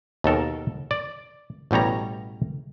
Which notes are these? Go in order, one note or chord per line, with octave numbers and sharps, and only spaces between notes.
D#2 B2 A4 A#4
D5
A1 B2 G3 C#5 A#5